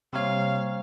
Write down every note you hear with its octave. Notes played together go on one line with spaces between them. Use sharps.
C3 G3 A#3 C5 C#5 F5